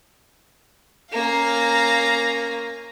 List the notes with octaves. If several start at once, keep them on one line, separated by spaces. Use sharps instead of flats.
A#3 C#4 F5 A#5